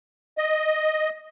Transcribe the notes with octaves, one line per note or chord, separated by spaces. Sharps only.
D#5